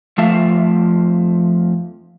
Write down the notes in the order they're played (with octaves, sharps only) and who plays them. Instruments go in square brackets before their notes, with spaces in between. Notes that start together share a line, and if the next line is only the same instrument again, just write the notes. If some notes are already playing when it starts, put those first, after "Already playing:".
[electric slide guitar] F2 F3 A3 E5 F5 A5